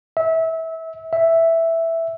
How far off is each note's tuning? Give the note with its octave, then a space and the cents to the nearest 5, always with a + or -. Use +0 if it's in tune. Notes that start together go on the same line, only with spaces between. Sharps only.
E5 -25
E5 +0